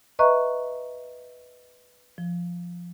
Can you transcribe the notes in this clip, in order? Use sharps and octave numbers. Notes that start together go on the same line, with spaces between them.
B4 D#5 E5 A#5 C#6 F#6
F3